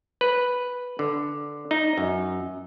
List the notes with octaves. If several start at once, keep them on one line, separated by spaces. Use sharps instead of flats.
B4
D3
D#4
F#2